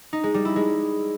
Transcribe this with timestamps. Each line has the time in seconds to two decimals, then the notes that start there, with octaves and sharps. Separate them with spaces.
0.13 D#4
0.24 G#3
0.34 G3
0.45 E4
0.56 G#3